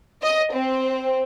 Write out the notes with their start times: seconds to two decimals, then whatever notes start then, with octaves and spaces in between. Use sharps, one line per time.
0.22 D#5
0.53 C4